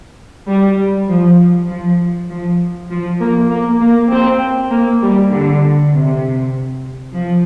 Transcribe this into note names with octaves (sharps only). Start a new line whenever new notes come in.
G3
F3
F3
F3
F3
A#3
A#3
A#3
C4
A#3
G3
D3
C3
F3